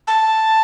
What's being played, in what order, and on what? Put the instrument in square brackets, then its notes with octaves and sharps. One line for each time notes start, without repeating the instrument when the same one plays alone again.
[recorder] A5